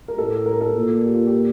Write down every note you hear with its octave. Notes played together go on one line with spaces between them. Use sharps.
A#4
A2 A4
A#4
A4
A#2
G4
F4
G4